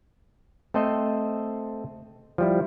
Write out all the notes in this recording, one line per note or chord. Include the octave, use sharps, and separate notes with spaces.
A3 C4 A4 C5 D#5
F3 G3 E4